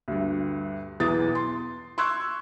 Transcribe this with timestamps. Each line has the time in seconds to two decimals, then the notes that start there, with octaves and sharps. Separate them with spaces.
0.08 D2 G2
1.00 B1 E2 E3 B3 D#6 A6
1.35 C6
1.98 C6 C#6 E6 F#6 G#6